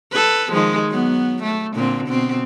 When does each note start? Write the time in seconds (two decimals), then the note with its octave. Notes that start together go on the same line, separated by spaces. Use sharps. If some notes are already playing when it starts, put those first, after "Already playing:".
0.12 A4 B4
0.53 D#3 F3 G#3
0.89 F#3 B3
1.43 A3
1.74 A#2 D3 C4
2.09 B2 C4